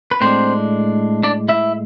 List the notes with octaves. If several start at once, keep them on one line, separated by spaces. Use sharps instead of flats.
B4
A2 G#3 C4 D4 C5
D4 D5
E4 E5